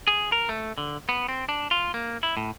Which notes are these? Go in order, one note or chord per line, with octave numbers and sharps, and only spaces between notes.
G#4
A#4
A3
D3
B3
C4
D4
F4
A#3
E4
A2